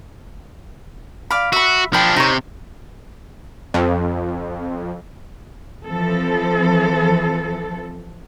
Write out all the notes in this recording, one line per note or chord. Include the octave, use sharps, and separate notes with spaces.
D5 F5 B5
F#4 E5 B5
F3 D4 G5 B5
C3 D#4 C#5
F2
E3 F3 C4 A4